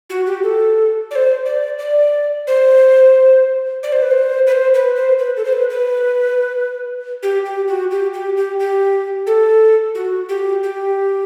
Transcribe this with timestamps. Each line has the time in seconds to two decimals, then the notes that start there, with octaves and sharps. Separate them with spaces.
0.10 F#4
0.26 G4
0.43 A4
1.11 D5
1.15 C5
1.46 D5
1.79 D5
2.47 C5
3.83 D5
3.92 C5
4.02 B4
4.11 C5
4.47 B4
4.52 C5
4.74 B4
4.96 C5
5.19 B4
5.37 A4
5.45 C5
5.53 B4
5.70 B4
7.23 G4
7.45 G4
7.68 F#4
7.91 G4
8.14 G4
8.37 G4
8.60 G4
9.27 A4
9.95 F#4
10.29 G4
10.63 G4